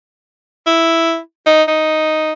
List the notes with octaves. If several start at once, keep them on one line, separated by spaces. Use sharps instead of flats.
E4
D#4
D#4